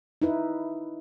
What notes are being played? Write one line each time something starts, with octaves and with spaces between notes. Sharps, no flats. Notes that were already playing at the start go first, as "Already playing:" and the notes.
D#4 E4 B4